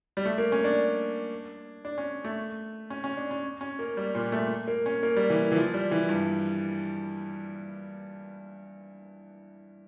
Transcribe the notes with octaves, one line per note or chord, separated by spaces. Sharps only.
G3
A3
A#3
C#4
D4
D4
C#4
A3
C#4
C#4
D4
C#4
C#4
A#3
G3
A#2
A3
A#3
C#4
A#3
G3
E3
E3
F3
G3
E3
G2